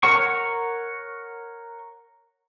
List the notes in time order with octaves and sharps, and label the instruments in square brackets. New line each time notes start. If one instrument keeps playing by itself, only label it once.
[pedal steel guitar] A#4 C#5 F#5 C#6